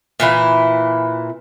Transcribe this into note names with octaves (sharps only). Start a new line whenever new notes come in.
A#2 E3 E4